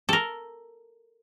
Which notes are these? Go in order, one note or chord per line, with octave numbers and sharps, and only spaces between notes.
A4 A#4